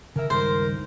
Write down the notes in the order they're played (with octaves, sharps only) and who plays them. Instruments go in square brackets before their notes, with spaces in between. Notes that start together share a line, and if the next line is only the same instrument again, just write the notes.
[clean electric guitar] C#3 E5 [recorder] A#4
[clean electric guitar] C#2 [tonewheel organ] G2 D#3 [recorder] A#4 [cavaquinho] C5